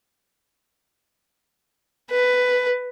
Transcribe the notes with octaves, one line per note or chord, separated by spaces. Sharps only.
B4